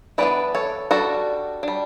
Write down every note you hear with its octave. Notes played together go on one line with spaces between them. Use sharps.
E3 B3 D4 B4 D5
A4 C#5
G3 D4 F#4 A4
G3 D4